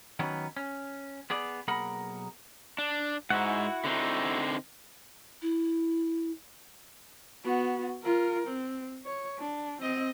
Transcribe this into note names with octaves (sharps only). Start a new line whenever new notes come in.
D#3 F#3 B3 C#4
C#4
B3 G#4 D5
B1 A#3 G#4 A#4 F#5 B5
D4
G#2 E4 F#4 F#5
D3 C4 D#4
E4
B3 F#4
F4 A#4
C4
C#5
D4
C4 D#5